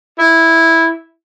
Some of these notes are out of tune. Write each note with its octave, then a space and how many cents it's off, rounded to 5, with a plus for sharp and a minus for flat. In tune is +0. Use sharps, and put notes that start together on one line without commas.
E4 -5